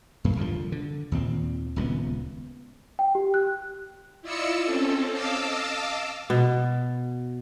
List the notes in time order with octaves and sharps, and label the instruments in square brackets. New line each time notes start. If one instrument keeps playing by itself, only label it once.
[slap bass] F#2 A#3
C2 D3 F3
D3
D#2 A#2 C4
D#1 C#2 C#3 B3
[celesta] G5
G4
F#6
[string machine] E4 F4 D5 D#5 E6 C#7
C4 C#4 A4
D#5 F5 A5 D6 E6
[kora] B2